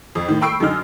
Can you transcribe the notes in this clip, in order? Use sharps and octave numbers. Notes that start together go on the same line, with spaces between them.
F2
A2 D#3
G5 B5 C#6 E6 C7 D7
F#2 D3 D#4 F6